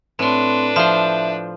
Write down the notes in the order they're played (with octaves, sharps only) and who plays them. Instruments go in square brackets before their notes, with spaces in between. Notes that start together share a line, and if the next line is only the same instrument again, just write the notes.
[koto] A2 [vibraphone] C4 C6 [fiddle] D4 B4
[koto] F3 C5 [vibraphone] E5